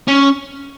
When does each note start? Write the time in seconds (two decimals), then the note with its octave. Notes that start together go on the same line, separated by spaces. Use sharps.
0.08 C#4